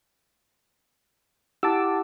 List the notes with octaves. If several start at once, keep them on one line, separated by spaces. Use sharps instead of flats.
E4 G4 F#5 A5 D6 E6